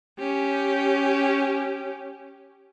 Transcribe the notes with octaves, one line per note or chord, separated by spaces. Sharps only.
C#4 G4